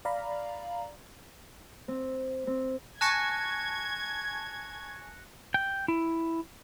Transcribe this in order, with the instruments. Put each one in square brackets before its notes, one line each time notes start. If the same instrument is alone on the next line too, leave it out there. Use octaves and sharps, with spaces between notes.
[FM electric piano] D5 F5 A#5 B5
[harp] C4
C4
[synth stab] G#5 A5 C#6 [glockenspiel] F#6 A#6 C#7 [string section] G#6
[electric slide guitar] G5
E4